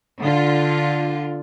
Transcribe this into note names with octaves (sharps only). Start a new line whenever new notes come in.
D3 F4